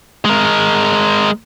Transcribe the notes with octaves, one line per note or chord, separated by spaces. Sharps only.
G#3 A#4